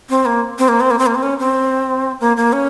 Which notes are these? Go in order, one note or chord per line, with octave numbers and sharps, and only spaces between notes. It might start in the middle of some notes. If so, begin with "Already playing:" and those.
C4
A#3
C4
A#3
C4
A#3
C4
A#3
C4
C#4
C4
A#3
A#3
C#4